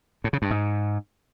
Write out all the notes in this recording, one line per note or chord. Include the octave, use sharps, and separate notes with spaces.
A2
C#3
G2
G#2